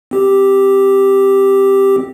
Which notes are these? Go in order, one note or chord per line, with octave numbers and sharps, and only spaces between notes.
C4 G4